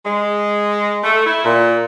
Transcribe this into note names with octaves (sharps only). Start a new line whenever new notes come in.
G#3
A3
E4
A#2